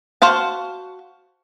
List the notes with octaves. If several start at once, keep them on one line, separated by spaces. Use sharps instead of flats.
F#4 C5 F5 A5